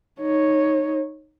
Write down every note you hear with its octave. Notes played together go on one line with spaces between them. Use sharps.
D#4 C#5